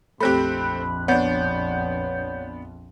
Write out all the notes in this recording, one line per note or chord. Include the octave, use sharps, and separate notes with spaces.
A#1 F2 A3 C4 G4 B5 F#6
B3 D4 C#5 F#5 G6